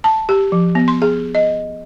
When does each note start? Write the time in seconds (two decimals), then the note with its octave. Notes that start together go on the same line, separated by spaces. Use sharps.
0.04 A5
0.29 G4
0.52 F3
0.75 B3
0.88 C6
1.02 G#4
1.35 D#5